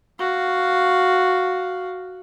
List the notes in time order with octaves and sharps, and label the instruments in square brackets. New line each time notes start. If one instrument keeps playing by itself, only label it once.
[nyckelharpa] F#4 F5